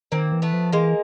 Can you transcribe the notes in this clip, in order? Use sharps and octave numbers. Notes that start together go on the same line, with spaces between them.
D#3 A#3 C4
E3
A3 B3
F3
E3 G#3 A#3